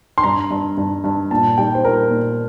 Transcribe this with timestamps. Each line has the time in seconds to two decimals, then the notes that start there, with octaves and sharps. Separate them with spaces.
0.18 C6
0.24 G2 A#5
0.51 G2
0.77 G2
1.04 G2
1.31 A#2 A5
1.58 G3 G5
1.75 C5
1.84 A#2 A#4
2.11 A#2